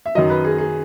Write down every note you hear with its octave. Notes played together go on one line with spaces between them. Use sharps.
E5
F#2 D#3 F#3 D#5
B4
G#4
G#4